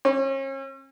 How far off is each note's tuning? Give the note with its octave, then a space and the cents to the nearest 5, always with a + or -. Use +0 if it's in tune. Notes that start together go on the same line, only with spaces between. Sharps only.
C#4 -40